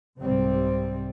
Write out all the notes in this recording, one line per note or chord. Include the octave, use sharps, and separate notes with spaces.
C2 G#2 C3 G3 C4